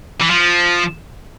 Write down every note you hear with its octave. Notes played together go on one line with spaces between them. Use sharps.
E3
F3